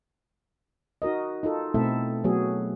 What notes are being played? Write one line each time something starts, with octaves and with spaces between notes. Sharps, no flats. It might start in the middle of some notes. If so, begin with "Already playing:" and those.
D#4 F#4 A#4 D#5
D#4 F4 A4
B2 A3 C4 E4 A4 E5
F#3 A3 B3 F#4 G#4